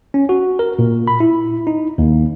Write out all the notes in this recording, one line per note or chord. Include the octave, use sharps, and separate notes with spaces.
C#4
F#4
A#4
A#2
B5
E4
D#4
D#2